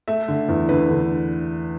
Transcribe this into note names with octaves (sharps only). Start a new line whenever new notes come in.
A3 E5
D3
E2
D3 B4
D3